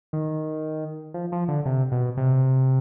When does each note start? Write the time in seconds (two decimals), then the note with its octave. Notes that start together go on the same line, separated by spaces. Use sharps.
0.13 D#3
1.14 F3
1.32 F3
1.48 D3
1.66 C3
1.92 B2
2.17 C3